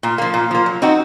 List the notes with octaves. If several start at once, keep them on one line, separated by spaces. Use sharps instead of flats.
A#2
F3 A#3
A#2
F3 A#3
F#3
C4 D#4 F#4